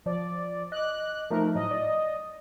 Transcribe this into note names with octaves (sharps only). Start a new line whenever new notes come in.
F3 D5
D#5 D6 F#6
F3 A3 D#4 A#4
A2 F#3 D#5
D5